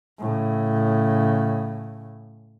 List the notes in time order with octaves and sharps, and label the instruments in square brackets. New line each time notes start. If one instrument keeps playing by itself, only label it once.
[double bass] A2 C#3